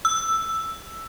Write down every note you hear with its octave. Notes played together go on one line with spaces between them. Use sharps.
E6